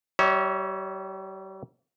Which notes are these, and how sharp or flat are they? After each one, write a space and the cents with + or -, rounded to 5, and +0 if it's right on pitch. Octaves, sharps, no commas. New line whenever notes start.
G3 -35 C#5 +0 E5 -35